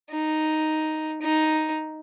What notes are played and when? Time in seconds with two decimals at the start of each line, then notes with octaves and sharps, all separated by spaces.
0.11 D#4
1.22 D#4